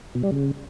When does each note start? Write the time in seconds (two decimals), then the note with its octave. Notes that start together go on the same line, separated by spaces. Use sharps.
0.15 B2
0.23 G3
0.32 C#3